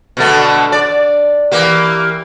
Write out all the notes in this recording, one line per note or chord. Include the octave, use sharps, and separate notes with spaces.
B2 D3 A3
D5
E3 A#3 G4